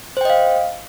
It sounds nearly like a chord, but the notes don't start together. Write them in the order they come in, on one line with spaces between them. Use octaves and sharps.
C5 G5 D#5 F5